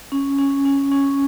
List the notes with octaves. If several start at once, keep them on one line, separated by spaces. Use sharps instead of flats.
C#4
C#4
C#4
C#4